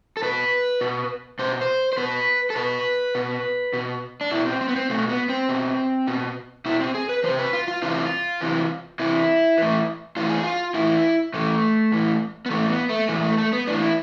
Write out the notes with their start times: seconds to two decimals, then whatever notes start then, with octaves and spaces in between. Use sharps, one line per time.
0.17 A4
0.22 B2 B4
0.81 B2
1.39 B2 C5
1.61 C5
1.93 C5
1.97 B2 B4
2.50 A4
2.56 B2 B4
3.15 B2
3.73 B2
4.21 D4
4.31 B2 E4
4.46 C4
4.61 C4
4.68 B3
4.76 C4
4.90 B2 A3
5.09 B3
5.29 C4
5.49 B2
6.07 B2
6.66 B2 E4
6.80 C4
6.95 G#4
7.09 B4
7.24 C3 E3 C5
7.39 B4
7.53 F4
7.68 F4
7.82 C3 E3 F4
8.41 C3 E3
8.99 C3 E3 E4
9.58 A2 E3
10.16 A2 E3 F4
10.29 G#4
10.43 F4
10.74 A2 E3 E4
11.34 A2 E3 A3
11.92 A2 E3
12.46 B3
12.50 A2 E3 A3
12.70 B3
12.89 A3
13.09 A2 E3 G#3
13.23 A3
13.38 A3
13.53 B3
13.67 A2 E3 D4
13.82 E4